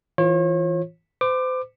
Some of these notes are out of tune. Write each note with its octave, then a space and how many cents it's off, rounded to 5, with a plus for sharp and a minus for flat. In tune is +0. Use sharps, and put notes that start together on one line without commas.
E3 -5 F4 +0 C#5 -40
C5 -35 D6 +20